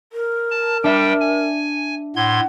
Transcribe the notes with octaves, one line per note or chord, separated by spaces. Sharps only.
A#4
A5
G3 D4 E5 G5
G#5
A2 F#5 C6 G#6